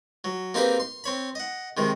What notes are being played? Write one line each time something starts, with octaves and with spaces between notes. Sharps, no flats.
F#3
A#3 C4 D#4 G4 G#4 B4
C6
C4 C#5 B5
D#5 F#5
C3 D#3 G#3